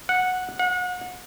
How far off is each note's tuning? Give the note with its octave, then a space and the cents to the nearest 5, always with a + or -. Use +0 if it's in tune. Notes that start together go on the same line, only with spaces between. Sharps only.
F#5 -10
F#5 -35